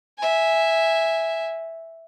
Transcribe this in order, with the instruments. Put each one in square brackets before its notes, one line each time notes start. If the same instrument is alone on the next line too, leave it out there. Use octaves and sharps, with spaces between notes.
[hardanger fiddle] E5 G#5